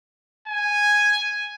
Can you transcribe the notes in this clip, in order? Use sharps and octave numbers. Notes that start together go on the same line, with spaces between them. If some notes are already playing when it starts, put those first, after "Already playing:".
G#5